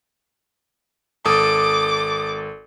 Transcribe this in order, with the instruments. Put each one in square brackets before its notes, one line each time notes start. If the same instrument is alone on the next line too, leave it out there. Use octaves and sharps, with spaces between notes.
[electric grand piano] G#1 A4 D#6 [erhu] D6